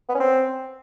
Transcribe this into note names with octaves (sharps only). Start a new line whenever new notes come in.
B3
C#4
C4